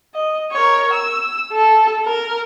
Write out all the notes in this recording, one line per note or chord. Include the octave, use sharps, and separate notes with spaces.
D#5
A#4 C#5
E6
A4
A#4